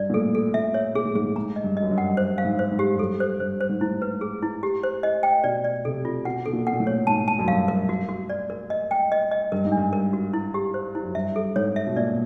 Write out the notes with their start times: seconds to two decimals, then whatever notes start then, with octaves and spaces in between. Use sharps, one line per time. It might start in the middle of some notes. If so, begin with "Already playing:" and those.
Already playing: G2 D5
0.10 A#2
0.14 A2 A4
0.35 A4
0.54 A#2 E5
0.74 C#5
0.95 A#2 G#4
1.05 A2
1.15 G#2 G#4
1.24 A2
1.36 G#2 A#5
1.56 D#5
1.64 G2
1.77 D#5
1.83 F#2
1.91 G2
1.98 F#5
2.17 G2 C5
2.38 F5
2.45 G#2
2.59 C5
2.72 G#2
2.79 G4
2.94 F#2
2.99 G2 A4
3.20 C5
3.40 G2 C5
3.61 C5
3.69 G#2
3.81 A2 E4
4.02 B4
4.21 G#4
4.43 E4
4.63 G4
4.83 C5
5.03 D#5
5.23 G5
5.44 B2 D5
5.64 D5
5.85 C3 A4
6.05 F4
6.25 B2 F#5
6.46 B2 A4
6.53 A#2
6.67 F#5
6.73 A#2
6.80 A2
6.87 C#5
7.07 G#2 A5
7.28 A5
7.39 F#2
7.48 G2 F5
7.68 A#4
7.89 F#4
8.09 F#4
8.30 D5
8.50 A#4
8.70 D#5
8.91 G5
9.12 D#5
9.31 D#5
9.52 G2 A#4
9.65 G#2
9.72 D4
9.77 G2
9.93 A#4
10.13 F#4
10.33 E4
10.54 G4
10.74 C5
10.95 E4
11.03 F#2
11.15 G2 E5
11.36 A4
11.56 G#2 C#5
11.76 E5
11.87 B2
11.96 A#2 D5